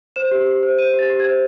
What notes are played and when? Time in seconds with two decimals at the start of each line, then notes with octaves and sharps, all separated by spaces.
0.16 C5 E7
0.31 G4
0.47 G4
0.63 C5
0.78 C5 D#7
0.94 G4 A6
1.10 G4
1.20 C5 G#6